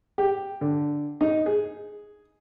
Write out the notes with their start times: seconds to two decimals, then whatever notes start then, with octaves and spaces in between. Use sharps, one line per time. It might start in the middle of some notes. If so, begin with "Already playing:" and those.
0.18 G4
0.61 D3
1.21 D#4
1.46 G#4